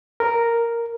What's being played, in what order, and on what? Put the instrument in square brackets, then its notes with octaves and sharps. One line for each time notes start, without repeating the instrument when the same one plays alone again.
[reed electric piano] A#4